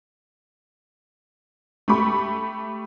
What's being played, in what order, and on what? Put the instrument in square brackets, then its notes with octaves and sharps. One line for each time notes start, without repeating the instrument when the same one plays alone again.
[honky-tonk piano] A3 G4 B5 C#6